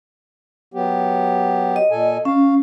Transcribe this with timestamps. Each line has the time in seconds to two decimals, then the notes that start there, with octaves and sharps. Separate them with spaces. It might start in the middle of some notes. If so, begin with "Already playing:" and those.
0.74 F#3 B3 G4
1.76 D#5
1.91 A#2 A4 G#5
2.25 C#4 F5